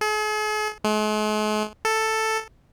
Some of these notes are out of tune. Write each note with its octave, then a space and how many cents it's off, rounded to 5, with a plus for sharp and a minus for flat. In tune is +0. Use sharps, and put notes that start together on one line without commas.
G#4 +45
G#3 +45
A4 +5